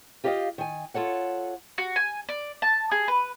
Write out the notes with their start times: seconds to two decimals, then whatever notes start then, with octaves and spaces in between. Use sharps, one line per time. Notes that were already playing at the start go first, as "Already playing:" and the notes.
0.24 F4 G4 A#4 D5 D#5 F5
0.58 D#3 G#5
0.94 F4 A4 C#5 F#5
1.78 F#4
1.96 G#5
2.29 D5
2.62 A5
2.91 G#4
3.08 B4